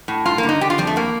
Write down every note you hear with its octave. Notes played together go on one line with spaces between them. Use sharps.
A2
G2 F4
A#3
D3
D#4
D3 G4
F4
F2 G3
A3
A2 A#3